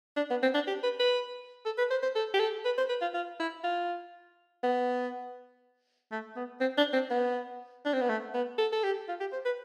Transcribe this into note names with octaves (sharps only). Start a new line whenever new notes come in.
D4
B3
C4
D4
G4
B4
B4
A4
B4
C5
C5
A4
G4
A4
B4
C5
B4
F4
F4
E4
F4
B3
A3
B3
C4
D4
C4
B3
D4
C4
B3
A3
B3
A4
A4
G4
F4
G4
C5
B4